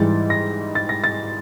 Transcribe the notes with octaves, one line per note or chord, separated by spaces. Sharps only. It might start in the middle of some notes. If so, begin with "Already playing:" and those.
Already playing: G#2 E3 G3 A6
A#6
A6
A#6
A6